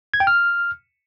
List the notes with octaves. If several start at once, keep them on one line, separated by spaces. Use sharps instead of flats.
G#6
G5
F6